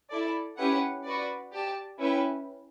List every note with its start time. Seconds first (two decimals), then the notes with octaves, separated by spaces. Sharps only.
0.10 E4 A4 D5
0.57 C#4 E4 G4 B4 F#5
1.04 F#4 B4 D5
1.52 G4 D5 A5
1.99 C#4 E4 B4 E5 G5